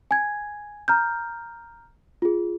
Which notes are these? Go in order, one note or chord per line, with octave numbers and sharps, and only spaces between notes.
G#5 G#6
A#5 F6 G6
F4 G#4